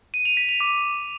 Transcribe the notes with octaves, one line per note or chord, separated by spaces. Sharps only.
D#7
F7
B6
F7
D6